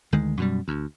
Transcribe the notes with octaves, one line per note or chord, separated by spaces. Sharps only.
D2 D#3 G#3
F#2 B2 G3
D2